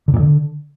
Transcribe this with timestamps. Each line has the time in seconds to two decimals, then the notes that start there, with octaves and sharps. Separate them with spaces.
0.08 D3
0.14 A#2
0.20 D3